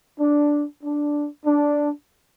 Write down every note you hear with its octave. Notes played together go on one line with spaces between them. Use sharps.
D4
D4
D4